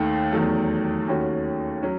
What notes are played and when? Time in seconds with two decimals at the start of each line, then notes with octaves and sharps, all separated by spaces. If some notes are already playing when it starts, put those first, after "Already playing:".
Already playing: D#2 D#3 A3
0.32 E2 D#3 F#3 A3
1.08 D#2 D#3 A3 C#4 F#4
1.83 F#3 C#4